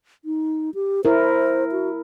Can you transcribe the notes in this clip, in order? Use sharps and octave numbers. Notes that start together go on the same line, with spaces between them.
D#4
G4
E4 A#4 C5
F#4